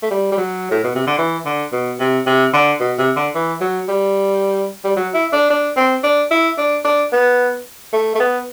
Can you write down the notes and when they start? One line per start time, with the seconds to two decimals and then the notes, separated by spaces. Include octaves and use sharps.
0.03 A3
0.11 G3
0.32 G3
0.38 F#3
0.71 A2
0.84 B2
0.95 C3
1.07 D3
1.18 E3
1.45 D3
1.73 B2
2.00 C3
2.26 C3
2.53 D3
2.80 B2
2.98 C3
3.16 D3
3.35 E3
3.61 F#3
3.88 G3
4.85 G3
4.96 F#3
5.14 E4
5.33 D4
5.50 D4
5.77 C4
6.04 D4
6.31 E4
6.58 D4
6.85 D4
7.12 B3
7.93 A3
8.15 A3
8.20 B3